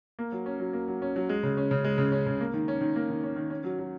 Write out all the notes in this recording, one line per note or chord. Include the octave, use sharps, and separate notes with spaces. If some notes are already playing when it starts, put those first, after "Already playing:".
A#3
F#3
C#4
F#3
A#3
F#3
C#4
F#3
G#3
C#3
C#4
C#3
G#3
C#3
C#4
C#3
A#3
D#3
C#4
D#3
A#3
D#3
C#4
D#3
C#4
F#3
F#3